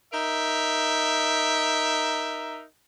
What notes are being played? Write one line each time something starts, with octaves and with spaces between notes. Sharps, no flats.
D#4 A#4 E5